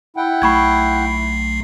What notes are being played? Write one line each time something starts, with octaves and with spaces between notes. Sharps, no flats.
E4 F#5 G5
B1 A3 B5 C#6 G#6 C7